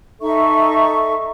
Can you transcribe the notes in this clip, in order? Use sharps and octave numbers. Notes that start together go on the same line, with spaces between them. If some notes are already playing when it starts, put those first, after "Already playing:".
D#4 A4 E5 C#6